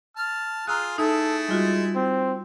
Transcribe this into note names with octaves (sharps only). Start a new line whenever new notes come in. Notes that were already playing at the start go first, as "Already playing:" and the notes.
A5 F6
F4 G#4 F5 A#5 E6 F#6
A3 D#4 E4 G#4 A4
G3 G#3 F4 F#4
C4